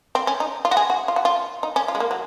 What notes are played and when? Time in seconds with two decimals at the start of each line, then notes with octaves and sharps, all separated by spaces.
0.15 C4
0.27 C#4
0.40 D#4
0.65 F4
0.71 F#4
0.77 G#4
0.90 F#4
1.08 F4
1.16 F#4
1.25 F4
1.63 D#4
1.76 C#4
1.88 F4
1.95 G#3
2.00 A#3
2.11 F#3